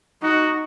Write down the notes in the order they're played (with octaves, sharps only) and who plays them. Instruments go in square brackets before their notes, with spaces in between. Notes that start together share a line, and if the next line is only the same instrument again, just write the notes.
[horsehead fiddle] D#4 [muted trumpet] F#4